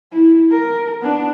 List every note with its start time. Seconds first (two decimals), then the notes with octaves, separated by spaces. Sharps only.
0.12 E4
0.51 A#4
1.01 B3 D4